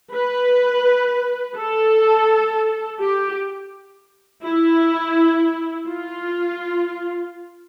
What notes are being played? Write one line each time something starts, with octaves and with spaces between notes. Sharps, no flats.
B4
A4
G4
E4
F4